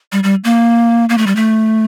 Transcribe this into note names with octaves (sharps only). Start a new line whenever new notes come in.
G3
G3
A#3
A#3
A3
G3
A3